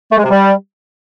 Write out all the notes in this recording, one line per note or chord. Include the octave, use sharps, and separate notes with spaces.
A3
G#3
C3
G3